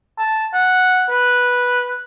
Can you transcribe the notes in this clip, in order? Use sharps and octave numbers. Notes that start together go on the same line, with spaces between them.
A5
F#5
B4